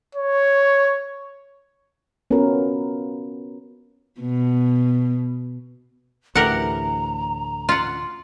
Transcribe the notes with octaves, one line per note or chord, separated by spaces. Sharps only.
C#5
B3 C#4 F4 F#4 A#4 B4
B2
D2 A2 E3 G4 A#4 F#5 A#5
F4 F#5